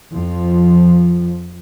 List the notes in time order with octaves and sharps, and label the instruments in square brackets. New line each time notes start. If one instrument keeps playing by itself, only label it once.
[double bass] F2 F3